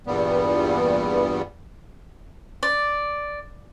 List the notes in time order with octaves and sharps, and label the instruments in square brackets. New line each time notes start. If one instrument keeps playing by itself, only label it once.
[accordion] E2 G2 A#2 G3 B3
[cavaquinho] D5